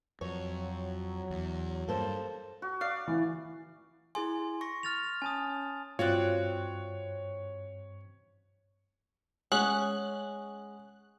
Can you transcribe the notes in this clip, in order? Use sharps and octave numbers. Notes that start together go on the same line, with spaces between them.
F2 F#3 C#5
E2
G2 A#3 A4 C5
F#4
D5 F5
E3
E4 G#4 G#5 C6
C#6 A#6
F6 A6 F7
C#4 G#5 A5 D#6
G2 C4 F4 F#4 C#5 D5 F#6
G#3 C#4 F#5 G#5 D#6 F#6